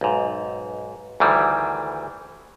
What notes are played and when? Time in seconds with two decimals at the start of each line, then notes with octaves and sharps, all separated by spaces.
0.01 B1 G#2
1.20 D2 D#3 E3 G3